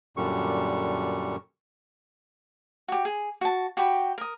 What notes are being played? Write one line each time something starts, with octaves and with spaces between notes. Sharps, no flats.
F#2 A#2 D3 G3 C#6
F#4 G4
G#4
F#4 A5
F#4 G4 G5 B5
A#4 D#6